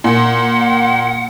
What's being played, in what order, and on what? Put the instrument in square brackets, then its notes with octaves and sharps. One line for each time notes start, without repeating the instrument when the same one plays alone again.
[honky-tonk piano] A#2 [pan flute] F#5